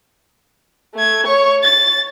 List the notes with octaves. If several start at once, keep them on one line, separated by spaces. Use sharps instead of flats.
A3 G#6
C#5 C#6
A6